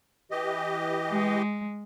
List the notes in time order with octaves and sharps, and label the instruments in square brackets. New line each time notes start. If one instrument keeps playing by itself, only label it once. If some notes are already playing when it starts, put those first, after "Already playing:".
[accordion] E3 G4 D#5
[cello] G#3